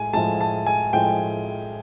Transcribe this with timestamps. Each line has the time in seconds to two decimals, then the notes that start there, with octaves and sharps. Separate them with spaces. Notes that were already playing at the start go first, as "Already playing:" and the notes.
Already playing: A2 G#3 G#5
0.13 A2 F3 G#3 A5
0.41 A5
0.66 G#5
0.93 A2 F3 G#3 G5